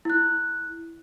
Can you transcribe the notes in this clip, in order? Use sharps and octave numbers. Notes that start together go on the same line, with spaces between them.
E4 F#6